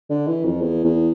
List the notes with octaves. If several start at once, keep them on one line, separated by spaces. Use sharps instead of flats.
D3
E3
F2
E2
E2